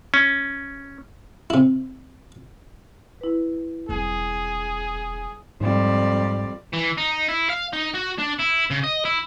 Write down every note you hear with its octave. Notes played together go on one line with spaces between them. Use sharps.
C#4
C3 E4
E4 B4
E1 G3 C4 G#4
F2 G#2 G3 D5
E3
D#4
E4
F5
D#4
F#4
D4
E4
C#3
D#5
E4